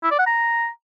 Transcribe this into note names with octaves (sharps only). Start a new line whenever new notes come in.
E4
D5
F#5
A#5